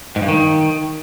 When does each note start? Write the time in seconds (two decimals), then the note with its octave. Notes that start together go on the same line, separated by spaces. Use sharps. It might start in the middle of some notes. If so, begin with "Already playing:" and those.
0.16 G#2
0.22 G2
0.28 D#3